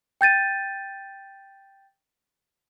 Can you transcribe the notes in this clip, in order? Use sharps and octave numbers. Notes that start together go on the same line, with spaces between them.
G5 G6 A6 D#7